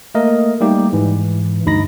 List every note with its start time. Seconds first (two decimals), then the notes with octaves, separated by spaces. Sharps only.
0.15 A3 A#3 A#4 D#5
0.61 G3 A3 A#3 D#4 G4
0.93 G#2 E3
1.65 D2 G2 D#4 B5 A#6